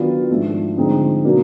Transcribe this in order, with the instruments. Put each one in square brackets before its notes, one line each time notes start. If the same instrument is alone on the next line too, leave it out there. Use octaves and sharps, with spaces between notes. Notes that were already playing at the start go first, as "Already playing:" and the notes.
Already playing: [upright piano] D#3 F#3 B3 D4 F4
G#2 F3 A3 D4
D3 F3 G#3 C4 D#4
B2 F#3 A#3 D4